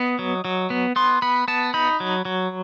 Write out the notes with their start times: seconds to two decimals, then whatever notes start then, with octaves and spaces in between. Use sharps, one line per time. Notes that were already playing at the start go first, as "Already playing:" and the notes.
Already playing: B3 D#5
0.19 F#3
0.45 F#3
0.70 B3
0.96 B3 C6
1.22 B3 B5
1.48 B3 A5
1.74 D#4 B5
2.00 F#3
2.25 F#3